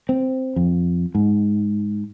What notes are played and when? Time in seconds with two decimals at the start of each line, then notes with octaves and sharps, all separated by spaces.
0.09 C4
0.56 F2
1.15 G#2